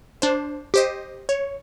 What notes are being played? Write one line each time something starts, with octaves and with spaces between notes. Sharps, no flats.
D4 C5
G4 C5 D#5
C#5